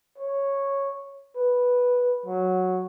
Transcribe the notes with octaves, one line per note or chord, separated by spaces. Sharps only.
C#5
B4
F#3